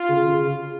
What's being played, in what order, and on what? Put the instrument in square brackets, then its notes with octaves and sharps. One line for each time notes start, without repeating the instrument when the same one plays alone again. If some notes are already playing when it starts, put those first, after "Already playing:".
Already playing: [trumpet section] F4
[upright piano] C#3
C#3